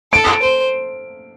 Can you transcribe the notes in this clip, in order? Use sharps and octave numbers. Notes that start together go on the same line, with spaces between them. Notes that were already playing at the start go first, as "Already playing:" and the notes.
A4 D7
C5